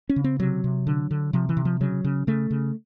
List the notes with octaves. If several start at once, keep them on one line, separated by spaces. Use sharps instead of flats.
C#4
C#3
C4
C3 F#3
C3
D3
D3
C3 F3
E3
C3
F3
C#3 F#3
C#3
C#3 A3
C#3